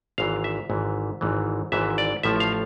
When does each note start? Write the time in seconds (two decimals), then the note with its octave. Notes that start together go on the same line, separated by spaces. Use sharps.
0.18 G#1 G#2 E3 F5
0.44 E5
0.70 G#1 G#2 E3
1.21 G#1 G#2 E3
1.72 G#1 G#2 E3 E5
1.98 D5
2.23 A1 A2 F3 E5
2.40 F5